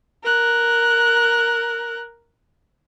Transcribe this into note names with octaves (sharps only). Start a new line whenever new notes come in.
A#4 F#6